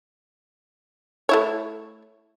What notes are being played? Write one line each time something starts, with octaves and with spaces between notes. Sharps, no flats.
A3 E4 C#5